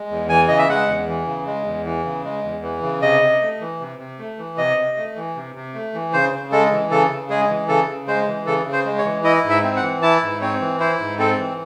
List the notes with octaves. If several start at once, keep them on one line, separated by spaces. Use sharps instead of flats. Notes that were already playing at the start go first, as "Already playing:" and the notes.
Already playing: G#3
E2
E3 G#5
C#3 D#5
E5
G#3 F#5
E2
E3
C#3
G#3
E2
E3
C#3
G#3
E2
E3
C#3
C3 D#5
C3
A3
E3
C3
C3
A3
E3
C3 D#5
C3
A3
E3
C3
C3
A3
E3
C#3 C5
C#3
G#3 A4
E3
C#3 A4
C#3
G#3 G#4
E3
C#3 A4
C#3
G#3 C5
E3
C#3 A4
C#3
C5
G#3
C#5
E3
E4 D#5
G#2
E5
C4
F#5
E3
E4 A5
G#2
C4 C#5
E3
E4 C5
G#2
C4 A4
E3